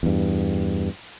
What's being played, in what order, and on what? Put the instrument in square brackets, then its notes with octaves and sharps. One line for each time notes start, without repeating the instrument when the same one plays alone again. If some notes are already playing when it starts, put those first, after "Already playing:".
[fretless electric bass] E2 G2